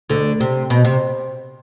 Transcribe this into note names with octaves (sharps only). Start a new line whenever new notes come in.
D2 D3
C3
B2
C3